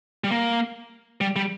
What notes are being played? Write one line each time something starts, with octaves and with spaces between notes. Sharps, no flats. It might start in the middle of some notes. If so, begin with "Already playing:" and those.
G3
A#3
G3
G3